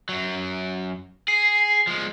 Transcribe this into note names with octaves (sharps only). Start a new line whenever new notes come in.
F#2 F#3
G#4 C7
F3 G#3